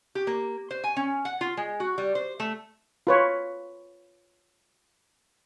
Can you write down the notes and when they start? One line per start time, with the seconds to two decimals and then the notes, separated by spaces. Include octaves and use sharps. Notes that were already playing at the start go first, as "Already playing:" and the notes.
0.15 G4
0.27 A#3
0.71 C5
0.84 G#5
0.97 C#4
1.25 F#5
1.41 F4
1.57 G#3
1.80 F#4
1.98 G3
2.15 C5
2.40 A3
3.07 F4 B4 C#5